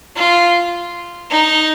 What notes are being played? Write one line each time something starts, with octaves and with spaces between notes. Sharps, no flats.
F4
D#4